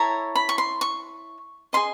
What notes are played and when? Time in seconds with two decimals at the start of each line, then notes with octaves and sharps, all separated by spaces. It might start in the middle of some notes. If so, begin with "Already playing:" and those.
Already playing: E4 A4 C#5 A#5
0.36 B5
0.49 C#6
0.58 C6
0.81 C#6
1.73 G#4 C5 D#5 C6